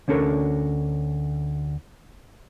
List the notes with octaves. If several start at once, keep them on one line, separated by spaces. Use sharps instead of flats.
D2 C#4 D4 A4 A#4 C#5